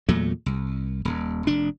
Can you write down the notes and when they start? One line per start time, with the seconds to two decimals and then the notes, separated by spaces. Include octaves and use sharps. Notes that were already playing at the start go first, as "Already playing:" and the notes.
0.09 E2 A#2 F#3 A3
0.46 C2
1.05 D#1
1.47 F1 D4